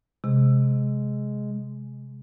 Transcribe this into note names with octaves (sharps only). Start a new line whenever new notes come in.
C3 G#3